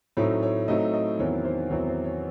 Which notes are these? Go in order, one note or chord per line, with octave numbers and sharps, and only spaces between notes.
A2 F#3 A3 C4 D#4 C#5
C#5
A2 F#3 A3 C4 D#4 D#5
D#5
E2 D#3 F#3 C4 E4 C#5
C5
E2 D#3 F#3 C4 E4 C#5
C5
C#5